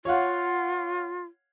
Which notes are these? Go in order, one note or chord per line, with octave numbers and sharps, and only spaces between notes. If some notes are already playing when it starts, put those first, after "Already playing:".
F4 C#5 F5 F#5